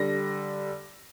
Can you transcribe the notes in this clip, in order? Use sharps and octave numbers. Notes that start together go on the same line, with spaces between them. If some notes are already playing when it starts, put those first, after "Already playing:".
Already playing: D3 G3 A#6